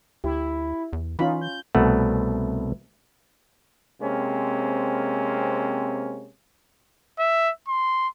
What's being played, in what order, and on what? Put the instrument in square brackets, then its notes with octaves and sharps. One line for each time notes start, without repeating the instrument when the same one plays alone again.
[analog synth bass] D2 [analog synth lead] E4 [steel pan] G4
[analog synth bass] E2
[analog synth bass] E3 [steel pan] C#4 F4 B5 [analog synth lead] D#4
[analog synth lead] G6
[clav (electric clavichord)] C2 B2 A3 F#5
[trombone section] C3 G#3 A#3 C4 C#4
[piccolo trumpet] E5
C6